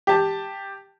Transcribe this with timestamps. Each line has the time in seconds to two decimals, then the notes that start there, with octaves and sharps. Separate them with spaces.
0.07 G4 A5